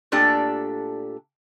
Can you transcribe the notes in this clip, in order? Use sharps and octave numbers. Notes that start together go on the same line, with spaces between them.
A#2 A3 D4 G4 A4